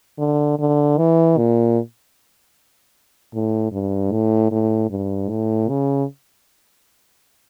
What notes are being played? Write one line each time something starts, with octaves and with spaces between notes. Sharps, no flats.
D3
D3
E3
A#2
A2
G2
A2
A2
G2
A2
C#3